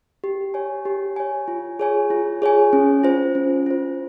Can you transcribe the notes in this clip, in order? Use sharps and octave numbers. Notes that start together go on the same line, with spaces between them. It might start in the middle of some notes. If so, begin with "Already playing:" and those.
G4
C#5 G#5
G4
C#5 G#5
F4
G#4 C#5 G#5
F4
G#4 C#5 G#5
C#4
F4 C5
C#4
F4 C5